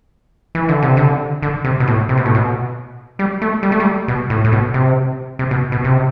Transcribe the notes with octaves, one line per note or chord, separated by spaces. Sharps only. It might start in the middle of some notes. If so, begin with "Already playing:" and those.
E3
D3
C3
D3
D3
C3
B2
A2
C3
B2
A2
B2
G3
A3
G3
A3
G3
B2
A2
A2
B2
C3
C3
B2
B2
C3